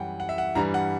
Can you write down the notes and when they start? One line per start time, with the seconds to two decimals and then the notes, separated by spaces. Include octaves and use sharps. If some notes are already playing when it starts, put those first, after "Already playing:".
Already playing: F#2 E3 G3 F#5 G5
0.20 F#5
0.29 E5
0.38 F#5
0.55 G2 E3 G3 A#5
0.74 F#5